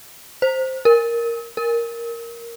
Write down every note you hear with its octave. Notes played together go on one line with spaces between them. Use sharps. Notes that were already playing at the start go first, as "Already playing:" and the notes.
C5
A#4
A#4